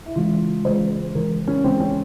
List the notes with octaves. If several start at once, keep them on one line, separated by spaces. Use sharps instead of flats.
E4
C#3 E3 G#3 F4
C#3 E3 G#3 C5
C#3 E3 G#3 A#4
C#4
C#3 E3 G#3 C4
C#4